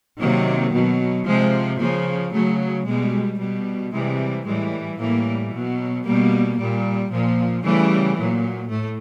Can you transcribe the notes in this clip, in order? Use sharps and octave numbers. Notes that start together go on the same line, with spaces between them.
C3 D#3 F#3 A#3
B2 F#3
C3 F3 G#3
C#3 F3 A#3
C#3 F#3 A3
B2 G3 G#3
B2 G3
C3 E3 G3 G#3
A2 E3 G3 G#3
A2 E3 G3 A#3
B2 F#3
B2 G3 A#3
A#2 G3
A#2 F3
C#3 E3 G3 A3
A#2 F#3
A2 A3